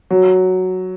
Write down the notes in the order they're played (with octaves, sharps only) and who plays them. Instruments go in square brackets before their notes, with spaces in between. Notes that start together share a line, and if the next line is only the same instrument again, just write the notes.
[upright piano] F#3